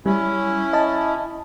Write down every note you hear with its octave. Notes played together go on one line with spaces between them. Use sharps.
G3 C#4 E4
D#5 A5